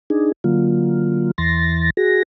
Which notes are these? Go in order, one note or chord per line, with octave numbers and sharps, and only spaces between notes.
D4 D#4 G#4
D3 F#3 A#3 F4
E2 E3 C6 A6 A#6
F#4 G#4 A#6